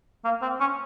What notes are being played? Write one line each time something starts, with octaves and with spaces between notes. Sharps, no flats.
A#3
C4
C#4